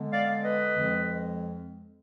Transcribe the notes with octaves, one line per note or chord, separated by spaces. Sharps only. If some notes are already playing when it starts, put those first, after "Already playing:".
Already playing: D3 G#3 B3
D5 F5
B4 D#5
F2 F3 G#3